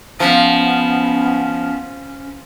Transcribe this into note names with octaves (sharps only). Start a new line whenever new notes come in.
F3 B3 C#4